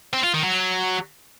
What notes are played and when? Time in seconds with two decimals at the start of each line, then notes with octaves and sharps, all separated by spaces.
0.13 C4
0.24 F4
0.34 D#3
0.44 F#3